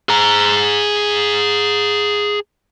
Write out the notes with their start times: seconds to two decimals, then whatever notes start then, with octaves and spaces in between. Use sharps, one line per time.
0.09 G#4 A#5